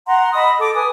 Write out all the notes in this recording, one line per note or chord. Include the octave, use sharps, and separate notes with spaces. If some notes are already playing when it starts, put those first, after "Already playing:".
F#5 A#5 C6
D#5 B5 D#6 E6
A4 D6
B4 G#5 D#6